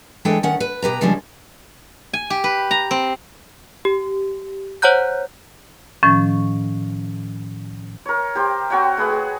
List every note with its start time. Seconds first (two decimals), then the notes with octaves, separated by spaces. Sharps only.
0.25 E3 G#3 D4 A4 G5 G#5
0.43 D#3 C#4 F#5
0.60 B4
0.82 B2 G4 B4 A#5
1.01 C#3 F3 G3 G#3 C#4 D4
2.13 G#5
2.30 G4
2.44 B4
2.71 A#5
2.91 C4
3.85 G4
4.82 C5 C#5 F#5 A#5 F#6 G6
6.03 A2 D#3 F3 C#4 A6
8.06 A#4 C#5
8.35 G4 C5
8.70 C4 F#4 C#5 G5
8.97 A3 G#4 B4 F#5
9.10 G#4